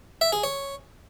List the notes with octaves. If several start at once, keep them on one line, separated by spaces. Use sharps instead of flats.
E5
G#4
C#5